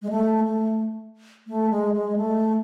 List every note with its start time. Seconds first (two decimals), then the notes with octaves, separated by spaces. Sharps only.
0.02 G#3
0.10 A3
0.44 A3
1.48 A3
1.70 G#3
1.94 G#3
2.16 A3